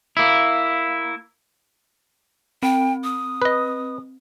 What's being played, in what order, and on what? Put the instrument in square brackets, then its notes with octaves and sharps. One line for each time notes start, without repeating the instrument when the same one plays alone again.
[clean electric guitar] A#3 E4
[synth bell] C4 [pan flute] G5
[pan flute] D#6
[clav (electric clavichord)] B4 D#5